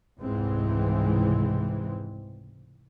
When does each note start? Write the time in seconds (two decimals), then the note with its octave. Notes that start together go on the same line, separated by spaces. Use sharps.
0.19 F1 C#2 G#2 E3 G#3 C4